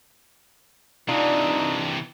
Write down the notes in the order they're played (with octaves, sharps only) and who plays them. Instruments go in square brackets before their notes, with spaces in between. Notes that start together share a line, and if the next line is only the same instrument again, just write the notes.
[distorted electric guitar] C3 E3 [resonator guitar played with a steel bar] D4 F4 [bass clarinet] D#4